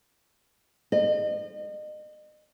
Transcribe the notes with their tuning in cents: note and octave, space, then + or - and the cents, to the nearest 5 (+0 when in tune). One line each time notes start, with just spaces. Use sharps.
D#5 -35